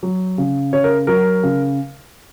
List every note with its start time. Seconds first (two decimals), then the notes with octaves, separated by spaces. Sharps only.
0.03 F#3
0.38 C#3
0.73 C#3 C#5
0.84 A#4
1.07 F#3 A#4
1.43 C#3